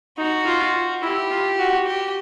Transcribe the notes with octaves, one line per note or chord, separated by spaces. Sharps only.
D#4 F#4
F4
E4 G4
F4
F#4
G4